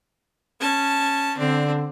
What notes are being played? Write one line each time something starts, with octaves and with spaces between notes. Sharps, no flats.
C#4 A5
D3 C4 D4